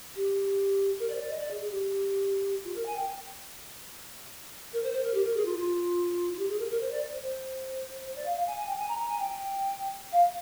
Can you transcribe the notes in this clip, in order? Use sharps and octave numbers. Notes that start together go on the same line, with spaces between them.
G4
A#4
D5
C5
D5
D#5
D5
G#4
G#4
G4
F4
A#4
G#5
G5
A#4
C5
C5
A#4
G4
A#4
G#4
F4
F4
F4
G4
G#4
A#4
G#4
A#4
C5
D5
C5
C5
C5
D5
F5
F5
G#5
G#5
G5
G#5
A#5
A#5
G#5
G5
F5